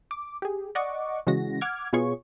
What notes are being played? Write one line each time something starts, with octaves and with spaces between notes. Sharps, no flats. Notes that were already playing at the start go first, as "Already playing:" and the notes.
D6
G4 G#4
D5 D#5 F#5 C#6 D6
C#3 E3 G#3 F#4 A#6
F#5 D6 F6 G#6
B2 B3 F4 G#4 C#5 C#6